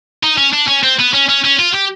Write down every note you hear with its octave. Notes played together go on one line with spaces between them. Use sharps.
D#4
C#4
D4
C#4
C4
B3
C#4
C#4
C#4
F4
G4